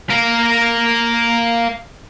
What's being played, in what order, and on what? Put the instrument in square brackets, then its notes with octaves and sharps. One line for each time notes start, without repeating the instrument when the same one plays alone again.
[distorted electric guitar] A#3 A#4